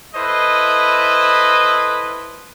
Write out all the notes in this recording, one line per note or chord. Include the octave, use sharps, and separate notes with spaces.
E4 A4 B4 C5 D#5